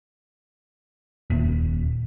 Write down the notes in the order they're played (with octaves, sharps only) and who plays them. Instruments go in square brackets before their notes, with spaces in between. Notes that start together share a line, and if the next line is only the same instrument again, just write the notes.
[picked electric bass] D#1